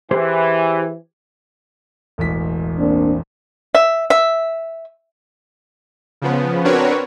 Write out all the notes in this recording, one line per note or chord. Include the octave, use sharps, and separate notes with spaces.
E3 G4 G#4 C5
E1 A1 B6
A#3 C4 D4
E5
E5
C#3 F3 B3
C4 D4 F#4 A#4 B4 C#5